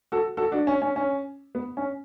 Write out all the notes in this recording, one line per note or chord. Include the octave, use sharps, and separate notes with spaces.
F#4 A4
F#4 A4
D4 F#4
C#4
C#4
C#4
B3
C#4